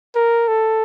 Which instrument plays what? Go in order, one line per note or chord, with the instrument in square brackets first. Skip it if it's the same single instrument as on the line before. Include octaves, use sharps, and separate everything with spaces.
[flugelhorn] A#4
A4